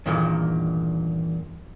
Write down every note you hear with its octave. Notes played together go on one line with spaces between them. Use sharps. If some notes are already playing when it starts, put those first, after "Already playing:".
E2 G2 A#2 D#3